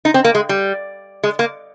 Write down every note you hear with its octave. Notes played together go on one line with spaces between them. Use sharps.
D#4
C4
A#3
G#3
G3
G#3
A#3